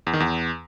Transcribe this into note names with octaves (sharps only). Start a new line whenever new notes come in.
E2
D#3
E2